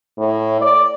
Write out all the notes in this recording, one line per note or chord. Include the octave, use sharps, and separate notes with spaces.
A2
D5